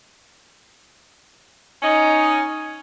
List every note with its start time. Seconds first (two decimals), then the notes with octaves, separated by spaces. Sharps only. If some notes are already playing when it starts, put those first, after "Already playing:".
1.82 C#4 D#4